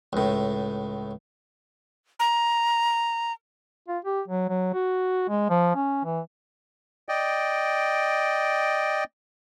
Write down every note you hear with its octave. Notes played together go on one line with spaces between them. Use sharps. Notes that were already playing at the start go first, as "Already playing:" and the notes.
C#2 A2
A#5
F4
G4
F#3
F#3
F#4
G#3
F3
C#4
E3
D5 D#5 G5